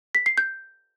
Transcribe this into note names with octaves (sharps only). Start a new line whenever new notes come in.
B6
C7
G6